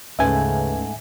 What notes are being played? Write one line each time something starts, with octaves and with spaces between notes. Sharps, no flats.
D2 G#2 C#3 A3 C#4 B4 E5 G#5